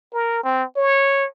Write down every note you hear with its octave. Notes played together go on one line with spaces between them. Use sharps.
A#4
C4
C#5